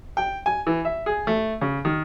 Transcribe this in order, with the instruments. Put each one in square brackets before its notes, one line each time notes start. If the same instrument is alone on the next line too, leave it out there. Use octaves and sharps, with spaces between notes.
[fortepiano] G5
G#5
E3
E5
G#4
A3
C#3
D#3